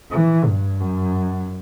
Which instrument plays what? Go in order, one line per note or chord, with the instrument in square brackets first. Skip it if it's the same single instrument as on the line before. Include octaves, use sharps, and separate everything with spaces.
[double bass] E3
G2
F#2